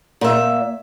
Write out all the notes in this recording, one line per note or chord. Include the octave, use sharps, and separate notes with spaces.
A#2 E5